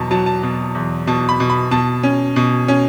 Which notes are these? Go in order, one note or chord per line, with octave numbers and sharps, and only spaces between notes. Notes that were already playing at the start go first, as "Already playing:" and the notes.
Already playing: E2 B2 F#3 A5
F#3 A5
A5
B2
E2
B2 A5
B5
B2
B5
B2 A5
C#4
B2
C#4